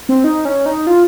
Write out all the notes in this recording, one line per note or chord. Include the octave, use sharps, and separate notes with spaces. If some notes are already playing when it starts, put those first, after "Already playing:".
C4
D#4
C#4
D#4
F4